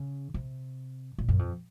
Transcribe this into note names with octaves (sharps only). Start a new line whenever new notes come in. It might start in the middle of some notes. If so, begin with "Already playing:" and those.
Already playing: C#3
C3
A#2
F#2
F2